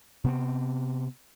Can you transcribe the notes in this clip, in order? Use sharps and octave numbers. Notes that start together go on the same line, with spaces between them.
C3 B3 C4